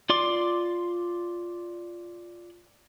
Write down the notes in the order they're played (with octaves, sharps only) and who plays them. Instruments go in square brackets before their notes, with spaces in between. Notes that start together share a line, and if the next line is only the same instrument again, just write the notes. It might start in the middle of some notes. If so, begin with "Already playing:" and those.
[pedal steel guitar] F4 D5 C6 D6